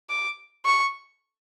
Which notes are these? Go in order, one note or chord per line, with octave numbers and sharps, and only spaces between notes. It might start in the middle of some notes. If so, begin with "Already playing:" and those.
D6
C#6